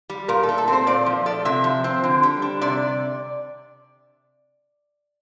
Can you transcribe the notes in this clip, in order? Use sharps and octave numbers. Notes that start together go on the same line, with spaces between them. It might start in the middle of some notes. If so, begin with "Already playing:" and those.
G3
A#2 A#4
A4
A3
A4
C4 C5
A#2 D5
F3
A3 D5
C3 E5
F3
C4
D3
G3
D4
C3 D5